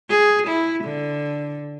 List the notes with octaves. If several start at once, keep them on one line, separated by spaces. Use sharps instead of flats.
G#4
E4
D3